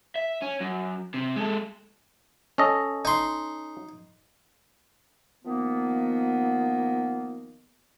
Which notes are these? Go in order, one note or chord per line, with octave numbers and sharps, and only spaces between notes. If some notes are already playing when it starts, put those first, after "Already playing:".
E5
C#4
F#2
C3
G#3 A4
C#4 A4 D#5
D#4 C6
D#3 F3 A#3 B3